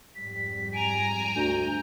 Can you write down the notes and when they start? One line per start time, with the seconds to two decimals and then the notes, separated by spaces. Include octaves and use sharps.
0.15 F2 G#2 G3 B6
0.73 G#5 A#5 D7
1.36 D2 G6